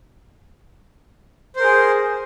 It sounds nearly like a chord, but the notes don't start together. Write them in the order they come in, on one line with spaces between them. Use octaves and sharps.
C5 A#4 G#4